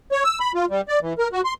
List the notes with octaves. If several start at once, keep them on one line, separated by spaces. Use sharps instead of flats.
C#5
E6
B5
F4
G3
D5
E3
A#4
F#4
C6